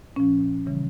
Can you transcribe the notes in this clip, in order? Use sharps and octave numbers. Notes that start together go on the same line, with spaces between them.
A#2 F3 C#4
C#3 E3 G3